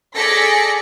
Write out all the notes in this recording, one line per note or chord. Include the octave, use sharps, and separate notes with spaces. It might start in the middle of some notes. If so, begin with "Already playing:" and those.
G#4 A4 D5 A#6 B6 C#7